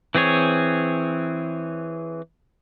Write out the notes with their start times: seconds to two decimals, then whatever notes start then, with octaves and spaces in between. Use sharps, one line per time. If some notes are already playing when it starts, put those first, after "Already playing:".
0.15 E3 C4 G#4 C#5